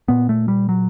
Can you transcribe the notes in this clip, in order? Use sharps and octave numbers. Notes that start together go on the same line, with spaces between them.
A#2 B3
A3
G3
F#3